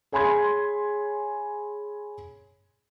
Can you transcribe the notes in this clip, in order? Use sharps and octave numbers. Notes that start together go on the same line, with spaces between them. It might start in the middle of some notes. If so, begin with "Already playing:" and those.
G#4 C#5 G#5 B5 C6 G#6